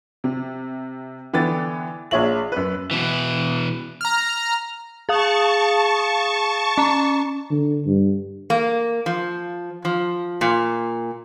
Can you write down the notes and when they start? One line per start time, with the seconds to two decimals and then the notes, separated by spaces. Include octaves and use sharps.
0.24 C3
1.33 D3 E3 B3 G5 A6
2.11 A#1 G#4 C#5 E5 F#7
2.52 F#2 B4
2.91 B2 E3
4.01 A#5 F6
5.09 G#4 F5 A5 C#6 D#6
6.78 C#4 A#5
7.51 D3
7.86 G2
8.50 A#3
9.06 F3
9.85 F3
10.41 A#2